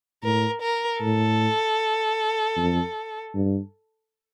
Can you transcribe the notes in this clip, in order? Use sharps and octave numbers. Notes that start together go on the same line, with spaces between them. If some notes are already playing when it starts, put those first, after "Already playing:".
A2 A#4
A#4
A2 A4
F2
G2